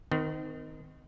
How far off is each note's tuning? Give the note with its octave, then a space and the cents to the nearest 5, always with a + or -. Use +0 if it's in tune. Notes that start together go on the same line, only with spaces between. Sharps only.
D#3 +0 C4 -40